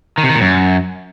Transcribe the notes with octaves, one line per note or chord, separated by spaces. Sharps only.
D#3
C3
D#3
A#2
F#2